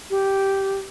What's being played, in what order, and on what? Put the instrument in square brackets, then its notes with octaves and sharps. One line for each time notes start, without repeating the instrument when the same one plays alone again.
[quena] G4